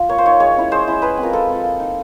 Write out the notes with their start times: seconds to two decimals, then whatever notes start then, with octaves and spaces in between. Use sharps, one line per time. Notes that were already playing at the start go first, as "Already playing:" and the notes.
Already playing: F4
0.09 A#3 C#5
0.18 C5
0.25 D#4 C#5
0.40 G#3 C#5
0.57 C#4 E4
0.71 G#3 C5
0.88 C#4 E4
1.02 G#3 B4
1.17 C4
1.23 F4 A#4
1.33 G#3 A4
1.49 C4 F4
1.64 A#3
1.80 D#4